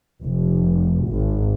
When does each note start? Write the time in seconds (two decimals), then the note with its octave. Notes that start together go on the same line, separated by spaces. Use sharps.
0.22 F1
1.09 G#1